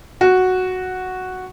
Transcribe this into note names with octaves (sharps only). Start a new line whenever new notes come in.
F#4